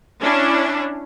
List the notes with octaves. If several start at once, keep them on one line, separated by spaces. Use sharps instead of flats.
C#4 D4 E4